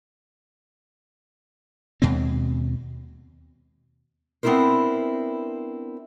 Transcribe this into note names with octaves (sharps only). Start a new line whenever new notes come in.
D#2 B2 G#3 C4
B3 C4 D4 E4 A#4 C5